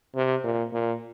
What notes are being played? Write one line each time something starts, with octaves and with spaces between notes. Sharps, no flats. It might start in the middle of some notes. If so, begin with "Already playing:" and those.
C3
A#2
A#2